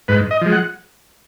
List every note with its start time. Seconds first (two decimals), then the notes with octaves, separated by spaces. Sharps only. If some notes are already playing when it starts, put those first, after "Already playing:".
0.08 G#2 B4
0.31 D#5
0.42 F3 G#3
0.52 F#5